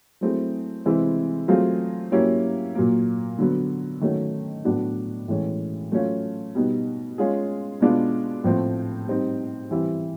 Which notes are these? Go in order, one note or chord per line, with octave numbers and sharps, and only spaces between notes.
F#3 A3 C4 E4 G#4
C3 E3 G#3 C4 E4
F#3 A3 C4 F4 G#4
F#3 A#3 C#4 E4 G4
A#2 F#3 A#3
D3 F#3 B3
D#3 F#3 A3 C#4 F#4
A2 F#3 B3 D4 F#4
A2 E3 G#3 C#4
F#3 A3 C#4 F4
B2 G3 B3 D#4
G#3 C#4 F4 G#4
B2 G#3 B3 D4 F4
A2 F3 A3 C4
G3 C4 D#4
E3 G3 C4 E4